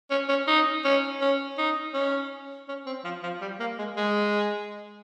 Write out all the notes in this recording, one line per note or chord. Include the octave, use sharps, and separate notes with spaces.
C#4
C#4
D#4
C#4
C#4
D#4
C#4
C#4
C4
F3
F3
G3
A#3
G#3
G#3